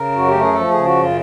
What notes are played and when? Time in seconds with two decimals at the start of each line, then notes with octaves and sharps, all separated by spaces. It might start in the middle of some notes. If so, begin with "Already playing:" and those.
Already playing: C#3 A#4
0.11 F#2 F#4
0.27 A3 G4
0.41 G#4
0.53 F3 A4
0.70 G#4
0.75 C#3
0.85 F#4
0.96 F#2 F4